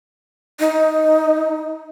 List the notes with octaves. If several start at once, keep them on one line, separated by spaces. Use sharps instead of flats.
D#4